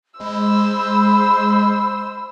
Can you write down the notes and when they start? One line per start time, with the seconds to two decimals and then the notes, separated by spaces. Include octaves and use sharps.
0.20 G#3 C5 B5 E6